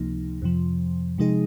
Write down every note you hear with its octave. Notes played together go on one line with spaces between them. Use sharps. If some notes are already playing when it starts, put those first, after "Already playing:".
Already playing: C#2 C3 F3 A#3 D#4
F2 C3 F3
C3 F3 G#3 D#4 G#4